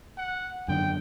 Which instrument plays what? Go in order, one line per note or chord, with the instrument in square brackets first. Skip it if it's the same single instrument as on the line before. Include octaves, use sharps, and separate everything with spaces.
[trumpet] F#5
[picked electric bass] F#2 D3 D#3 [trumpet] G5